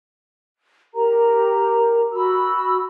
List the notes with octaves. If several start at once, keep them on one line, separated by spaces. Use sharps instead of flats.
G4 A#4 A#5
F#4 B5 E6